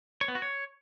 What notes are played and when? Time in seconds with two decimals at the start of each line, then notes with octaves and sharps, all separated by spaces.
0.21 C#5
0.28 B3
0.35 F#4
0.42 C#5